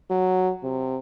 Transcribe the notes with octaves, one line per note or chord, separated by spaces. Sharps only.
F#3
C3